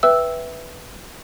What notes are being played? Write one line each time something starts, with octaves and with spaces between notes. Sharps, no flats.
B4 E5 G5 E6